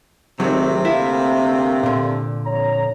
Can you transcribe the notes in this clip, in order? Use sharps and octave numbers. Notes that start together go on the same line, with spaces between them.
G#1 C3 D#3 E3 F#3 A3 C4
D2 A#3 E4 F5
A#2 D3
F2 C#5 A#5